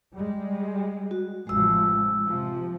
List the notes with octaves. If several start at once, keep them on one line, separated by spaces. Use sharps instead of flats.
G3 G#3
F#4
A1 C3 F3 G#3 E6
C3 F3